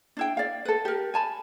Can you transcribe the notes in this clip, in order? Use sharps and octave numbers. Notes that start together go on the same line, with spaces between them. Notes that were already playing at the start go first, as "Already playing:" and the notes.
D4 E4 G5
D5 F5
A4 B4
G4 A#4
G#5 A5 B5